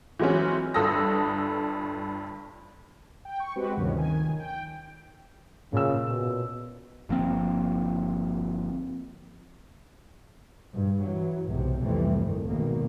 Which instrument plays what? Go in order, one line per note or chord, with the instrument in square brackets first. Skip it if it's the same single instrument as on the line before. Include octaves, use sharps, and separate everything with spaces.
[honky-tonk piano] E3 F#3 G#3 C4 C#4
G1 G2 A4 D#6 E6 A#6
[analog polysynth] G5
C#6
G#3 C4 F#4 G4 B4
D2 G2 C3 D#3 F3 C#4
D#3 G#5
G5
[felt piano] A#2 E6 [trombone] C#3
[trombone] B2
[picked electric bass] G1 F3 A#3 C4
[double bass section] G2
E3 F#3
B1 E2 G#2 C3
F1 C2 E3 G3 A3 C4
C2 G2 D#3
G#1 B2 D#3 A#3